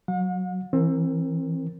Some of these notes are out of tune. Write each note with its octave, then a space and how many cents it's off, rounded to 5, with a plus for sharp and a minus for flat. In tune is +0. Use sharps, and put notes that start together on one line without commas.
F#3 +0 F#5 -45
E3 +0 C4 +25 A#4 -10